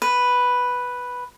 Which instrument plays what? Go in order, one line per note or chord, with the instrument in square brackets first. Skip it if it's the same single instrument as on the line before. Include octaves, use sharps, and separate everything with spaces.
[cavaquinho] B4